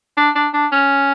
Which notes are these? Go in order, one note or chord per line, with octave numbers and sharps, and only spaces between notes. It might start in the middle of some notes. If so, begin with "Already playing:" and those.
D4
D4
D4
C#4